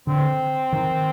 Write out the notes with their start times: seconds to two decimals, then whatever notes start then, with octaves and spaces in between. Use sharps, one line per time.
0.07 D3 C4
0.73 D#3